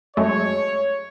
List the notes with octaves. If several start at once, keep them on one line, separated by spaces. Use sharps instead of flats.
F#2 G#3 A3 C#5